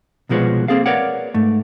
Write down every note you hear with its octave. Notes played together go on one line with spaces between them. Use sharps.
C2 B2 F3 G#3 B4 C#5
A#3 C4 G#4 A4 F5
A#4 B4 C#5 D5 F5 F#5
G#2 A3